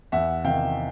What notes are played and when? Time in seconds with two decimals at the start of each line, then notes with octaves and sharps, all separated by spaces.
0.12 E2 E5 F#5
0.44 C3 D#3 F5 G5